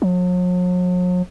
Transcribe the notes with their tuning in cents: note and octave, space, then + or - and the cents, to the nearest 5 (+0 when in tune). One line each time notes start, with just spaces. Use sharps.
F#3 -45